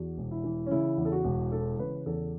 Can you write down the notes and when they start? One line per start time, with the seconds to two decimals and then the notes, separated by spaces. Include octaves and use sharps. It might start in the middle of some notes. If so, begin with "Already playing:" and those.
Already playing: E2 F#4
0.18 E1
0.31 E4
0.44 E3
0.66 C#4
0.71 C#3 E4
0.98 E2
1.05 A4
1.12 F#4
1.24 E1
1.52 E3 A4
1.79 C#3 B4
2.06 E2 A4